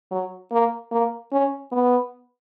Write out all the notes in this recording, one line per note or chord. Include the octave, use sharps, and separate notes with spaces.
F#3
A#3
A#3
C#4
B3